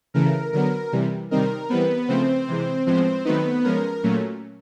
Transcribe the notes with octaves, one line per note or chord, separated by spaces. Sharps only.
C#3 E3 A3 A#4
D3 F#3 B3 A#4
C3 E3 G3
C3 D#3 G3 C4 D#4 A#4
E3 G3 B3 C4 B4
C#3 F3 A3 C4 C5
C3 E3 G#3
A2 F3 G#3 B3 C4 C5
D#3 F#3 A3 B3 C4 D#4 B4
F3 G#3 C#4 A#4
A#2 F#3 A3 C#4